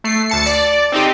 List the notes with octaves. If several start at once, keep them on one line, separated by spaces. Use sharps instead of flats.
A3 C7
D2 A5 C#7
D5
C4 D#4 G4